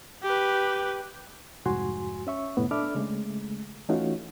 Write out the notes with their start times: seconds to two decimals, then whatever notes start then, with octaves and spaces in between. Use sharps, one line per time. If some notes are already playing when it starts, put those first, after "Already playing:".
0.23 G4 B4
1.66 C2 F2 G#2 F#4 G#5 C6
2.27 C#4 E5 C#6
2.57 F2 A2 C3 B3
2.71 D4 A4 E5 B5 D6 F6
2.95 C#3 G#3 A3
3.89 E3 A3 C#4 D#4 F4 F#4